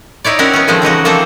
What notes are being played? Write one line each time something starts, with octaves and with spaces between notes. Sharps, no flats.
D#4 E4 C#5 D5
C4 C#4 E4 F#4 A#4
B3 C#4
D#3 F3 G#3 A3 C4
C#3 E3 D#4 F#4
F3 A#3 C4 A4 A#5